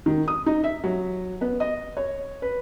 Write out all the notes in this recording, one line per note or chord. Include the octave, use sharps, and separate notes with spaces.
D#3
D#6
D#4
E5
F#3
B3
D#5
C#5
B4